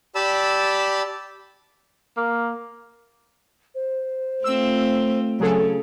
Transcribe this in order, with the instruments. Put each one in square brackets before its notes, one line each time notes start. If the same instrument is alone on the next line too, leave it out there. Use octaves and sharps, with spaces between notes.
[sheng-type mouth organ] G4 D5 A5 B5 E6
[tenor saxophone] A#3
[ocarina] C5
[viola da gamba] A3 C4 F4 [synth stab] E6
[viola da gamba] C#3 [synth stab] F#3 G#4 A4